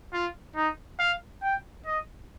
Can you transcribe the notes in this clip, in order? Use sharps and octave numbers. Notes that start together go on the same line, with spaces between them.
F4
D#4
F5
G5
D#5